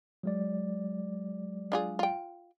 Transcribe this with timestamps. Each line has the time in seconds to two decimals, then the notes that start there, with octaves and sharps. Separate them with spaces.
0.23 F#3 G#3 D5
1.72 D4 F4 G#4
1.99 F4 G5